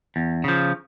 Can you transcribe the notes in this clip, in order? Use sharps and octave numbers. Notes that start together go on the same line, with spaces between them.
E2
C#3 F3